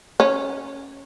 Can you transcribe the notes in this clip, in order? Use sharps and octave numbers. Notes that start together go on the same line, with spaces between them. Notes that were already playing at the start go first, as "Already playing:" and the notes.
C#4